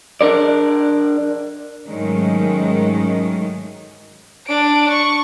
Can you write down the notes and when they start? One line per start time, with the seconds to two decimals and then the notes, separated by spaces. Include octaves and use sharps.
0.21 D4 A#4 D5
1.86 G#2 D#3 F#3 G#3 A3 C#4
4.46 D4 D7
4.91 C#6